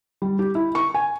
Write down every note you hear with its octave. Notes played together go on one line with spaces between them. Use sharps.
G3
G4
E4
C#6
G#5